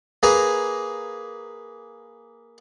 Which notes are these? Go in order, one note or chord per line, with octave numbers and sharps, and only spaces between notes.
A#3 G#4 B4 G#5 A#5